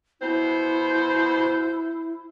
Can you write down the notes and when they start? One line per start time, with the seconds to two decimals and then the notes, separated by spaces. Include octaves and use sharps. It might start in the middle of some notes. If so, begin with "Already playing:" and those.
0.21 B2 E4 C5